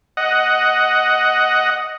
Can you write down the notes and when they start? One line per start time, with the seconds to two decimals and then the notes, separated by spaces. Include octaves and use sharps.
0.17 D#5 F#5